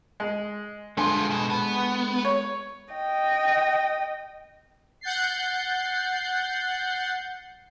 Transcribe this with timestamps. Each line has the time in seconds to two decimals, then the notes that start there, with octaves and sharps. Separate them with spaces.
0.20 G#3
0.97 G2 D3 G#3 F4 A4 C5 G#5
1.30 B2
1.50 B3
2.25 C#5
2.94 D#5 G5
5.01 F#5 G6 A6 C7